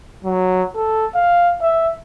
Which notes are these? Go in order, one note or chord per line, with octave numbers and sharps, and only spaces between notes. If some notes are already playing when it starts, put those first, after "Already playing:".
F#3
A4
F5
E5